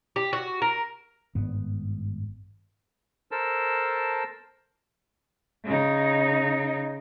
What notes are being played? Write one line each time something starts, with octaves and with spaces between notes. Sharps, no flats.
G4
F#4
A#4
G#1 G2 B3
A4 A#4 C5 A5 E6
C#3 D#4